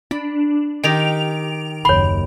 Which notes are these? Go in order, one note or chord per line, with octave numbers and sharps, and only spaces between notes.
D4 B5
D#3 D#4 G4 D7 F7
F#1 D#2 C#5 B5 C6